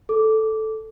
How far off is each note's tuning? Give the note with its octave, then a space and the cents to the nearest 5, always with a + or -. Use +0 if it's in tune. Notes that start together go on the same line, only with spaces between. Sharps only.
A4 -5 D6 -10